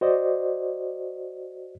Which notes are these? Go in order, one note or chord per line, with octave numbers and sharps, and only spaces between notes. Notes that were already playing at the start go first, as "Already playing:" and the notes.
F#4 C5 D5 D#5